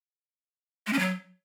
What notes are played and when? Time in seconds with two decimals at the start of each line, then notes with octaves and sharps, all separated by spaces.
0.87 G#3
0.93 C#4
0.99 F#3